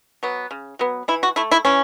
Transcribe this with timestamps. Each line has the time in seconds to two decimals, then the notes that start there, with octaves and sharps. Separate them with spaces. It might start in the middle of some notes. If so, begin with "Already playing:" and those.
0.23 F#3 B3
0.51 C#3
0.79 F#3 B3
1.08 E3 E4
1.23 F#4
1.36 A3 E4
1.52 E4
1.65 E3 C#4